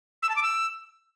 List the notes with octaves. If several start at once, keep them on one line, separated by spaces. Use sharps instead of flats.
E6
A5
D6
E6